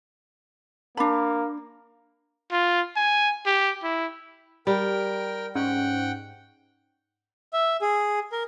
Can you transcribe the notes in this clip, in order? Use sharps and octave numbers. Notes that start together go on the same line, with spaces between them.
A#3 D4 B5
F4
G#5
G4
E4
G3 A#4 G5
G#2 C#4 F#5 G5
E5
G#4
A#4